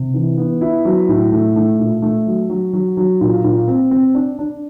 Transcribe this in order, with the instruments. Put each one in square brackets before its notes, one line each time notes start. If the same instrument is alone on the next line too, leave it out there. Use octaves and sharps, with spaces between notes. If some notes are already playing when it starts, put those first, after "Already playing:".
Already playing: [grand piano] C3
E3
B3
E4
F#3
A2
A3
A3
A#2
A3
F#3
F#3
F#3
F#3
A#2
A#2
C4
C4
D4
D4